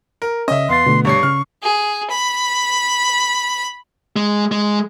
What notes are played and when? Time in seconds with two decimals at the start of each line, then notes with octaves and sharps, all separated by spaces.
0.22 A#4
0.48 C#3 C#4 D#5 E5
0.69 E2 B3 F5 C6 A6
0.86 B2 D3 A3
1.05 G2 C#5 C#6 C7
1.23 C#3 C#4 F6
1.63 G#4
2.10 B5
4.16 G#3
4.52 G#3